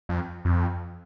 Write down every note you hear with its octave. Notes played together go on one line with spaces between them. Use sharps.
F2
F2